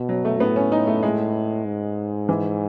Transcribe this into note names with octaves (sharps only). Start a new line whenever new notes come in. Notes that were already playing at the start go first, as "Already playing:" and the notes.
Already playing: B2
F#3
A3
A2 B3
C#4
D#4
A3
A2 G#3
G#2
E3